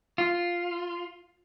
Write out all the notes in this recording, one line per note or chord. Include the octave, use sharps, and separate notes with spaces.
F4